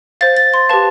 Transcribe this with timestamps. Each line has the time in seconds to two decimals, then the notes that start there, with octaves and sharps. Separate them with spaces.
0.21 C5 F5 A6
0.37 A6
0.54 C6
0.69 G4 B4 F5 A5